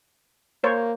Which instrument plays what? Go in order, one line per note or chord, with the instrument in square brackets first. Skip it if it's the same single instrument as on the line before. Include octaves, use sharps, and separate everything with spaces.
[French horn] A#3 [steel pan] C5 C#5